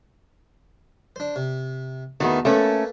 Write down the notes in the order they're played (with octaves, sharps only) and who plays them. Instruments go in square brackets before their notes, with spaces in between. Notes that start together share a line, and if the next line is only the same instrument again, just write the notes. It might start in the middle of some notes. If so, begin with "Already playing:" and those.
[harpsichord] D4 C5
C3
[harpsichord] E2 F#4 D#6 [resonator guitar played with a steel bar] D#3 A3 B3
[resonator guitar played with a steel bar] A3 C#4 [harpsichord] A#3 A4 B4